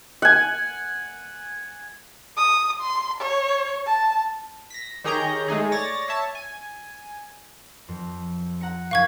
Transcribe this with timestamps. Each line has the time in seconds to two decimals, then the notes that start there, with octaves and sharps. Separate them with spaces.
0.22 F#5 G#5
2.37 D#6
2.81 C6
3.21 C#5
3.87 A5
4.70 A#6 B6
5.04 D#3 G4 G#4 C#5 A#5 G6
5.48 G#3 A3 D#4 G#4
5.72 C#5 D5 A6 A#6
6.08 C#5 E5 A5
6.35 G#5
7.89 F2
8.61 F#5 A#5 C#7
8.91 F#1 E4 F5 C#6 G#6 B6